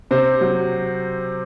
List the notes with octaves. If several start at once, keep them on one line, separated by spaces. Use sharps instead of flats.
C3 C5
F#3